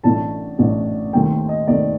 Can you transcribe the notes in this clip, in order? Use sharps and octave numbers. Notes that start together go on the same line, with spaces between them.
A1 A2 A3 D4 A5
A1 A2 A3 D4
D#2 D#3 A3 C4 G5
D#5
D#2 D#3 A3 C4 D5